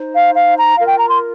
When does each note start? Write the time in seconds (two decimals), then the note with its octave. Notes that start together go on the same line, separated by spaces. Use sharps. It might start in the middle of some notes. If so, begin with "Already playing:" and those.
Already playing: D#4 C5
0.13 F5
0.34 F5
0.56 A#5
0.76 F4 A#4 F5
0.87 G5
0.98 A#5
1.09 C6